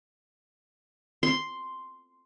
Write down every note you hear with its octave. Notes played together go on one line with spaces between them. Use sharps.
C6